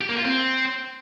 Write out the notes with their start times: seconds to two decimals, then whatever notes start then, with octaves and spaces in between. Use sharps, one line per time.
0.01 G4
0.09 A#3
0.17 F4
0.25 C4